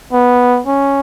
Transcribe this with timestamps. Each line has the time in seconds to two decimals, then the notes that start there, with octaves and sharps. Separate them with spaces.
0.12 B3
0.66 C#4